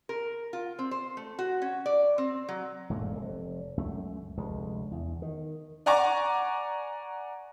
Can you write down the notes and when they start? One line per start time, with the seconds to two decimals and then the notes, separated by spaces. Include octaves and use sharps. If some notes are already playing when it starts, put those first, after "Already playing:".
0.09 A#4
0.53 F4
0.79 C4
0.91 C5
1.17 A3
1.39 F#4
1.62 C#4
1.86 D5
2.18 C4
2.49 F#3
2.90 E1 G#2 A3 A#3
3.15 F1
3.77 C#2 F#2 A3
4.37 F1 D2 G#3
4.91 E2
5.22 D#3
5.86 D5 F#5 G#5 A#5 C#6 D6